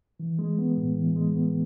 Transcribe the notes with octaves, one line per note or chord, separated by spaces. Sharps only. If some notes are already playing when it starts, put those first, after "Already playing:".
E3
G#3
B3
A2
E3
G#3
B3